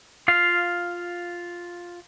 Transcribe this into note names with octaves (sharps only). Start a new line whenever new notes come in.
F4 F5